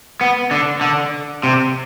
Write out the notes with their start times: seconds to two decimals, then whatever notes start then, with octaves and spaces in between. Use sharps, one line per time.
0.21 B3
0.51 D3
0.81 D3
1.43 C3